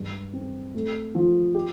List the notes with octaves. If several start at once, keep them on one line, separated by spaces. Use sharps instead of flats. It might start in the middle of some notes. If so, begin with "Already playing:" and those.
Already playing: G2 G#3
C4
A3
F3
G4